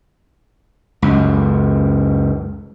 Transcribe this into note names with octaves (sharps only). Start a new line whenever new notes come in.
C#2 F#2